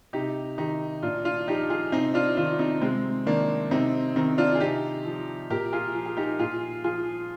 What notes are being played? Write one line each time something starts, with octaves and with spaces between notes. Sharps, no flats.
C3 D#4 G4
D#3 D#4 G4
A#2 D4 F4
D4 F4
F3 D#4 G4
F4 G#4
C3 C4 D#4
D4 F4
D#3 D4 F4
C4 D#4
C3 G#3 C4
D#3 A#3 D4
C3 C4 D#4
D#3 C4 D#4
D4 F4
G#4
C3 D#4 G4
F3
A#2 G4 A#4
F4 G#4
F3
G#4
D#4 G4
A#2 F4 G#4
F3 F4 G#4